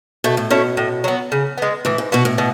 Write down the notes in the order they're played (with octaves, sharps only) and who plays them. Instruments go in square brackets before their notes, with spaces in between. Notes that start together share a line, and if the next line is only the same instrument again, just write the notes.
[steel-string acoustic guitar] B2 [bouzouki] A3
[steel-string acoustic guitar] A2
[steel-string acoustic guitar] B2 [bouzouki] C#4 E4 A4
[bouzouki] A2
F#3 B3
C#3
G#3 B3
[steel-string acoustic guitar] A2 [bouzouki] E3
[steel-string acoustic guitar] G#2
[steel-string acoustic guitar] B2 [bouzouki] B3 F#4
[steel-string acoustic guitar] A2
[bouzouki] B2